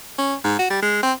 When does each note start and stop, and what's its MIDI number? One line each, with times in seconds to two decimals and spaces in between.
0.18 0.35 61
0.44 0.57 44
0.59 0.67 66
0.70 0.82 55
0.82 0.98 56
1.03 1.13 60